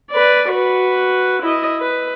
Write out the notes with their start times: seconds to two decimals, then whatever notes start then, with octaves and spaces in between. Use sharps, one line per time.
0.11 B4 D5
0.50 F#4 B4
1.42 E4 D#5
1.81 B4